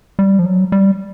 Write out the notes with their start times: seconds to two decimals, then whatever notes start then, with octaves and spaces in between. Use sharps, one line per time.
0.19 G3
0.39 F3
0.46 F#3
0.72 G3